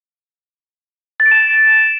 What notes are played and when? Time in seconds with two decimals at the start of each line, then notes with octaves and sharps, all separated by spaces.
1.20 A6
1.26 D7
1.31 E7